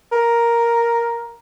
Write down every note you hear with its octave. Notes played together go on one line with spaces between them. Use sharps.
A#4